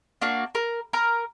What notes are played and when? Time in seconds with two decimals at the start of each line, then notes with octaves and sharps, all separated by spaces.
0.21 A#3 D4 F#4
0.55 A#4
0.93 A#4 A#5 F6